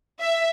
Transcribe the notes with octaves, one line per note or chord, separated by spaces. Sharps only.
E5